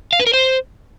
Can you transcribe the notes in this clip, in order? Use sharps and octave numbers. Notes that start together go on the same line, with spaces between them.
F5
B4
A#4
C5